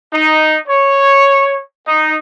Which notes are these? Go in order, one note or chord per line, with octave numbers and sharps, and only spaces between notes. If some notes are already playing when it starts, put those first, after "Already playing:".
D#4
C#5
D#4